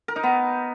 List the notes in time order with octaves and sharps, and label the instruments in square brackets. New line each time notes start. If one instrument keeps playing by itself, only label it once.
[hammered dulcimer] A#4
D#4
B3